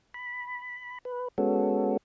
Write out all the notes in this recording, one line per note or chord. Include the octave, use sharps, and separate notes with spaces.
B5
B4
G#3 B3 C#4 F#4 A4